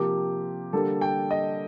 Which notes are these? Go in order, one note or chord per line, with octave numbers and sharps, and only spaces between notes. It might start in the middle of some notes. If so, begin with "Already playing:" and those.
Already playing: C3 F3 A#3 G4
D3 G3 A#3 A4
G5
D#5